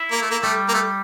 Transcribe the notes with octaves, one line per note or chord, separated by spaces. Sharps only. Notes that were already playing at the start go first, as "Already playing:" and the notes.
Already playing: E4
A#3
A3
A#3
G3 A3
A#3
A3